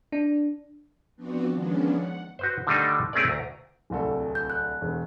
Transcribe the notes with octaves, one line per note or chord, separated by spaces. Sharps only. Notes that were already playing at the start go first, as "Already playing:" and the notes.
D4
F3 B3 C4 D4 F#4
D#3 F3 G#3 B3 C#4 D4
F#5
F#4 B4 C5
D3 D#3 G3 A3 D4 D#4
A3 C4 C#4 G#4 A#4 D5
D2 A#5
D1 C2 A4
G6
F#6
E1